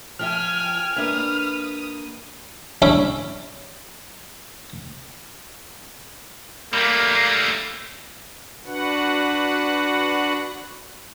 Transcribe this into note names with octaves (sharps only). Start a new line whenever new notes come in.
F3 E5 G5 G#5 F6
A#3 D4 B4 E5 D#6
G3 C#4 D4 E4 G4
G3 A3 A#3
D4 F#4 B4 F#5